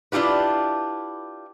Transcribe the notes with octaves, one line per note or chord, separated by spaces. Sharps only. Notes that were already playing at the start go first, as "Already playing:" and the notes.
D4 E4 F4 G4 B4